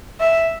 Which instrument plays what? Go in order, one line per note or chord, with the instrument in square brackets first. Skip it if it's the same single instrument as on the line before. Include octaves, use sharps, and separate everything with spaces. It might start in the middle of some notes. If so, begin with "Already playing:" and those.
[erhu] E5